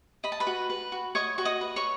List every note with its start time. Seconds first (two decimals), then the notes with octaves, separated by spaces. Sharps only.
0.24 D#5 B5
0.32 A5
0.40 B4 B5
0.47 F#4
0.70 B4
0.92 F#4
1.15 C#5 D#5 C#6
1.38 F#4 C#6
1.45 D#5 D#6
1.61 B4
1.76 C#5 C#6